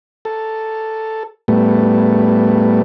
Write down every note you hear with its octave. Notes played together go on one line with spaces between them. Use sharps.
A4
A2 G3 A3 B3